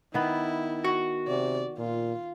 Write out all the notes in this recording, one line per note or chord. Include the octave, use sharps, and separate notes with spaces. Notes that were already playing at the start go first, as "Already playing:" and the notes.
D#3 B3 E4
F#4
C3 D5
A#2 F4